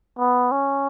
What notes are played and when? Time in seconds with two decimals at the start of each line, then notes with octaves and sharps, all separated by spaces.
0.19 B3
0.52 C#4